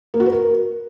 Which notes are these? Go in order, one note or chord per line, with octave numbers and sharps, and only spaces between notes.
A#3
F#4
B4
A#4